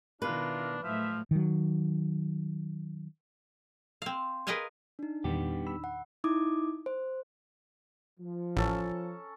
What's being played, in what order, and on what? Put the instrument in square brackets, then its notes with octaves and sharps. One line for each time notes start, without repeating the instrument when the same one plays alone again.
[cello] B2 D#3 [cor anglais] D4 [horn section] E4 F4 A#4 [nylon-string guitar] B4
[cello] A2 F#3 [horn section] D#3 E5 [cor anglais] F3
[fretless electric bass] D#3 F#3
[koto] C4 F5
G#4 A#4 B4 D#5 F5 G#5
[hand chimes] D4 D#4
[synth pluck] E2 A#2 D#3 [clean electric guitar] G3 B3 G4
[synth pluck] B5 E6
[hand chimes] F#5
D#4 E4 D6 D#6
C5
[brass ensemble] F3
[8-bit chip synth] A1 [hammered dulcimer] C#4 A4 A#5